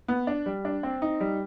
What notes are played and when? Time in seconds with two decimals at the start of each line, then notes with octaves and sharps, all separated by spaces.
0.08 B3
0.27 D4
0.46 G3
0.65 D4
0.83 C4
1.02 D#4
1.20 G3